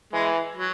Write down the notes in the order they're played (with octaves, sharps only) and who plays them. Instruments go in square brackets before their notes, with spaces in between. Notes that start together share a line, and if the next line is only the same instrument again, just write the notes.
[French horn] E3 [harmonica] G#3
[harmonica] F#3